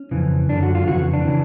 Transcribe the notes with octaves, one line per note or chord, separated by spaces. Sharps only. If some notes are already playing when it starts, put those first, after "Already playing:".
Already playing: C#4
F2 C#3 E3
F#2 D3 D4
F#4
F4
F2 C#3 E3 F#4
D4
C#3 E3